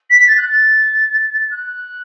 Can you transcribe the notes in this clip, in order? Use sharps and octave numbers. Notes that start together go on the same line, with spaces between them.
B6
A6
F#6
A6
F#6